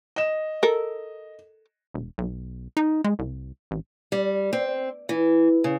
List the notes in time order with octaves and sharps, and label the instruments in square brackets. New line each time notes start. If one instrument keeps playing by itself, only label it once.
[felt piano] D#5 E7
[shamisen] A4 A#4
[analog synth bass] E1
B1
D#4
G#3
C2
A1
[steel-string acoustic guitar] G3
C4
E3
C#3